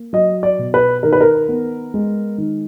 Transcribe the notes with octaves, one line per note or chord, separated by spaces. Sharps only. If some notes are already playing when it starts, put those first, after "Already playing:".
Already playing: A#3
F#3 D#5
D5
B2
B4
D#3 A#4
B4
A#4
B3
G#3
D#3